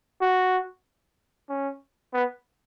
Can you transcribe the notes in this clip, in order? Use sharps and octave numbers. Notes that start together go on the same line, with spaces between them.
F#4
C#4
B3